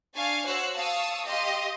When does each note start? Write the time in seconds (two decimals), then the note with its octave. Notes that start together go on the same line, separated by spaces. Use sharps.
0.15 D4 F5 G#5 C#6 A6
0.46 F#4 C5 C#5 E6 F#6
0.77 F5 A5 C#6 D#6 E6
1.25 G4 D#5 F5 C6